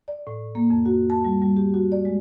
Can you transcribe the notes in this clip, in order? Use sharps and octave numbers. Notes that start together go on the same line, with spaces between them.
D5
A2
A#3
F2
F#4
A5
G3
G3
G4
F#4
D5
G#3